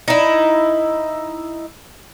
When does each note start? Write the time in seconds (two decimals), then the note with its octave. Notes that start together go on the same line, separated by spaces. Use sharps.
0.08 D#4 E4